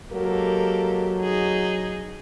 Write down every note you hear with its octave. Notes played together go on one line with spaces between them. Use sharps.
F#3 G#3 A#3 G4 A4 A#4
D#4 G#4